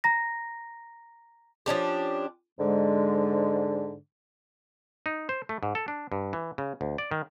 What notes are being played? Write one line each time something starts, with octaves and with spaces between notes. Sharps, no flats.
A#5 A#6
F3 C#4 D4 G4
G#2 D3 G#3
D#4
C5
A3
G#2
A4
D4
G2
E3
C#3
D2
D5
D#3